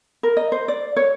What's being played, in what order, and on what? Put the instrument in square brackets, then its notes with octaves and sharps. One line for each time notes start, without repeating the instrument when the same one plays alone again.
[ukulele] A#4
D#5
C5
D5
C#5